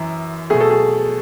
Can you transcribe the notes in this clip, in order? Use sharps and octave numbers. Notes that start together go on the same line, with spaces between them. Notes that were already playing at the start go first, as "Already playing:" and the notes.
Already playing: F#2 E3
B2 A3 G#4
A4
G#4